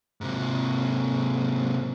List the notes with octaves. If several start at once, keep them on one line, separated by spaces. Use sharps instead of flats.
G#2 C3